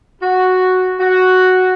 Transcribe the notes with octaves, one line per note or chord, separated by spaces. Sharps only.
F#4
F#4